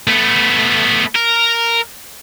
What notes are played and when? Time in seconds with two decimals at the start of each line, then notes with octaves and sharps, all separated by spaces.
0.08 A3 B3
1.16 A#4